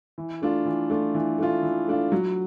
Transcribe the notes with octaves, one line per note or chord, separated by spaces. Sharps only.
E3
A3 D4 F4
E3
A3 D4 F4
E3
A3 D4 F4
E3
A3 D4 F4
F#3